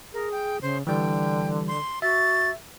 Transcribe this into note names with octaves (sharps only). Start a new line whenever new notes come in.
G#4 A#4
G5
C#3 C5
D3 E3 G3 G5
C6
F#4 E5 A6